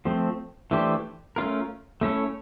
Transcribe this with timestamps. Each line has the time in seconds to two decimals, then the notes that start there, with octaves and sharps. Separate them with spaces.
0.05 F3 A3 C4
0.71 E3 A3 D4 G4 C5
1.36 A3 C#4 F4 A#4
2.01 A3 C#4 E4 A4 C#5